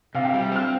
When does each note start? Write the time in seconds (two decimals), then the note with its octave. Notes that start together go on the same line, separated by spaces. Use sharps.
0.15 C3 F5
0.25 G5
0.29 G3 F5
0.42 G5
0.52 C4 F6